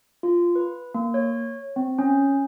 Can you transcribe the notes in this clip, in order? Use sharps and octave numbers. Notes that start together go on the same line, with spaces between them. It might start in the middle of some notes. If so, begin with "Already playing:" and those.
F4
B4
A#3
C#5
C4
C#4